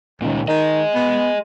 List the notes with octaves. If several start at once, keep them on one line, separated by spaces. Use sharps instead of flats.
C#2 A#2 D#3
D#3 G#4 D#5
B3